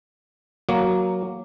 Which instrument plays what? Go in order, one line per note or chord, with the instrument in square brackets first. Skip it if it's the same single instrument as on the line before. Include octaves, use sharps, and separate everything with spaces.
[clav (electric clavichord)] F#3 A#3